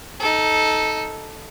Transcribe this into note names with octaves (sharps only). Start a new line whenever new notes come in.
D#4 A4